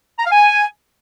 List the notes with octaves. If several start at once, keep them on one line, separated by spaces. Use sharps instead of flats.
A#5
F5
G#5